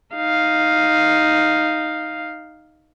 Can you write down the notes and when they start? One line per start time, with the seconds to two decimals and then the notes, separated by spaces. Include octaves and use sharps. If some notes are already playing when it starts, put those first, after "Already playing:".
0.16 D#4 F5